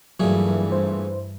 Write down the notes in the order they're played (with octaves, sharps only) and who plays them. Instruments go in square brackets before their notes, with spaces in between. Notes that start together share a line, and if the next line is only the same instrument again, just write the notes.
[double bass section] G2 E3 [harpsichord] A#2 A3 G#4 [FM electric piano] F#3
[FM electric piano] C5